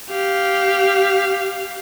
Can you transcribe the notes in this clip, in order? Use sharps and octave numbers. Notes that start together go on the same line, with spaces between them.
G4 F5